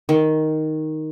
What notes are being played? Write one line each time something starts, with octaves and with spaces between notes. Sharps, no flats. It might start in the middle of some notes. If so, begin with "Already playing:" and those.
D#3